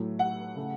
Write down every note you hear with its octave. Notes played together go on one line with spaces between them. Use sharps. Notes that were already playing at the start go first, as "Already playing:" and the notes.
Already playing: A2 F#3 A3
F#5
C#3 A3